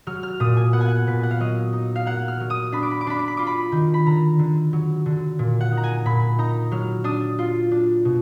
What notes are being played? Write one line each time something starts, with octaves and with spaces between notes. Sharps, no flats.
F#3 F6
F6
A#2 D#6
G#5
B3 F#5
G#5
F#5
A#2 B4
F#5
F5
F#3 D#5
D#4
F5
A#3 F#5
F6
F#3
D#6
D4 B5
D6
B5
D6
D4 B5
D6
B5
F4 D6
B5
D#3
B5
D3 A#5
D3
F#3
D3
A#2
F#5
D#4
A#5
G#5
A#2 B5
D#4 A#5
F#3 F6
D4 D#6
F4
D4
B2